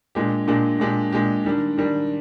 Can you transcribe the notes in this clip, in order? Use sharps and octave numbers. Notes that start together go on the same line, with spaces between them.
A#2 G#3 D4 G4
A#2 G#3 D4 G4
A#2 G#3 D4 G4
A#2 G#3 D4 G4
D#3 G3 D4
D#3 G3 D4